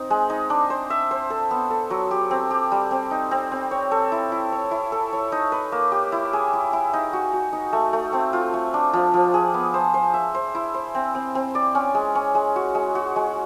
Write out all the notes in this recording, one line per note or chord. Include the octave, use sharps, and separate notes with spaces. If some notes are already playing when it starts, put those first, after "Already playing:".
Already playing: C4 D#4
G#3
D#4
D4
C5
E5
C5
A4
B3
A4
F#3
G4
C4
G4
G3
C4
D#4
C4
C4
C#5
A4
E4
E4
C#5
E4
A4
C#5
D#4
B4
A#3
G4
E4
G#4
E4
E4
D#4
F#4
F#4
D#4
A3
A3
C4
F4
A3
D4
F3
F3
G#4
B3
C5
C5
E5
C5
E4
C5
C4
C4
C4
D5
C#4
G#3
C#4
G#3
F#4
G#3
F#4
G#3